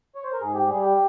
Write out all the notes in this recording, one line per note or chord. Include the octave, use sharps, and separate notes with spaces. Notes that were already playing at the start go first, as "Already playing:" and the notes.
C#5
C5
A#4
G#2 G#4
G4
G3 G#4
G4